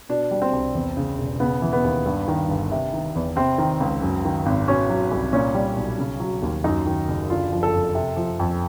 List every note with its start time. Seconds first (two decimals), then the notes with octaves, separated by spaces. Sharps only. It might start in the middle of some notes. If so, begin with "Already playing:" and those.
0.09 B2 D4
0.31 G3
0.42 C4
0.53 C2
0.75 E2
0.97 C#3
1.18 E1
1.40 C#3 B3
1.62 E3
1.73 B3
1.84 D#2
2.06 G2
2.28 D#3
2.49 G1
2.71 C3
2.93 D#3
3.15 E2
3.36 C3 C4
3.58 D#3
3.80 C#2
4.02 F#2
4.25 D#3
4.46 G#1
4.68 B2 C#4
4.89 F#3
5.11 C2
5.33 A#2 C#4
5.55 G3
5.76 B1
5.98 C#3
6.20 F#3
6.42 D#2
6.64 F#2 D#4
6.86 D#3
7.08 F#1
7.30 D3 F4
7.52 F3
7.63 A4
7.73 F2
7.95 C3
8.17 F3
8.40 F2